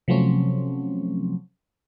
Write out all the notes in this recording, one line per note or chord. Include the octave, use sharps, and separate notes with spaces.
C3 F3 F#3 A3 C4 C#4